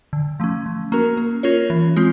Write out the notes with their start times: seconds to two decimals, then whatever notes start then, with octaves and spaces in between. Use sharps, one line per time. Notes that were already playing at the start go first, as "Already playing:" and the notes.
0.13 D3
0.40 F3 A3 C#4
0.66 F3
0.92 A#3 C#4 F#4 A#4
1.17 A#3
1.43 C#4 F4 A#4 C#5
1.70 E3
1.96 G#3 C4 F4